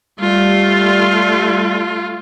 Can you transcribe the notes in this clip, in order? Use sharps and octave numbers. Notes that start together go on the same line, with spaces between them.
G3 A3 F4